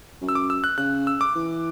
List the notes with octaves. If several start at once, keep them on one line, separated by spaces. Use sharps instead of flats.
F#2
E6
D6
E6
F#6
C#3 F#6
E6
D6
E3